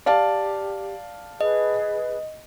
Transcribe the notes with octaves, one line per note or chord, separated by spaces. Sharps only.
G4 D5 F5 A5
G#4 B4 D#5